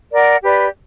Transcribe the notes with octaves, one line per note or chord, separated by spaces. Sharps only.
A#4 D5 F#5
G4 B4 D5